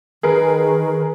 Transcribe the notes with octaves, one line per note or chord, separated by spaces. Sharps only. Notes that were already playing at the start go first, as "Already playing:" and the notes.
D#3 G#4 A#4 B4